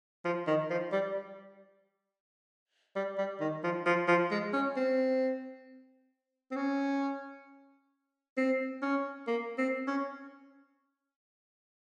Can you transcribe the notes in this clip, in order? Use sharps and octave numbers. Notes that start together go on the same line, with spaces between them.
F3
D#3
F3
G3
G3
G3
D#3
F3
F3
F3
G#3
C#4
C4
C4
C#4
C4
C#4
A#3
C4
C#4